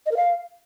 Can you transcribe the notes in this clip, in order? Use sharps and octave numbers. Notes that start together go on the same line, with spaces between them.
D#5
A#4
F5